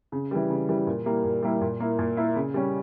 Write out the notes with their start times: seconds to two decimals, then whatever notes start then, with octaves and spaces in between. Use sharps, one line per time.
0.12 C#3
0.31 E3 G3
0.50 C#3
0.69 E3 G3
0.87 A#2
1.06 G3 A#3 E4
1.24 A#2
1.43 G3 A#3 E4
1.61 A#2
1.80 A#3 E4
1.99 A#2
2.17 A#3 E4
2.36 C#3
2.54 G3 C#4